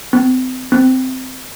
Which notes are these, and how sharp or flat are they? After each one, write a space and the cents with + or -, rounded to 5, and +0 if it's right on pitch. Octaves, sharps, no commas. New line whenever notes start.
C4 -35
C4 -15